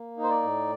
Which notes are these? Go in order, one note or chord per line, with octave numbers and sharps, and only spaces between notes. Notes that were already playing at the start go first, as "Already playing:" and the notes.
Already playing: A#3
D#4
C5
D5
A2